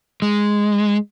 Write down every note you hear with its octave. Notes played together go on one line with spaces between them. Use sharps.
G#3